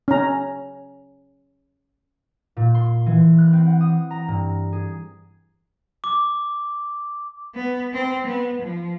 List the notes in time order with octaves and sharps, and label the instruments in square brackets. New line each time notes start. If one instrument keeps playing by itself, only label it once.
[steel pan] C#4 A#5
[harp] A#2
C6
E3
F#6
C4
F#5
D#6
A#5
G2
G#4
[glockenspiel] D6
[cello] B3
C4
B3
F3